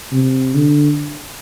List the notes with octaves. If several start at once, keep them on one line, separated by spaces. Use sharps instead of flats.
C3
D3